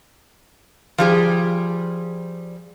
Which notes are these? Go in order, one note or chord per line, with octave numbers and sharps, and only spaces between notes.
F3 G3 G#4